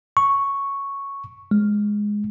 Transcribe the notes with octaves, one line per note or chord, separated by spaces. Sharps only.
C#6
G#3